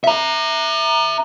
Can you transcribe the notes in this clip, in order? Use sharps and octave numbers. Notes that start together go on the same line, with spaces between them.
E5 A#5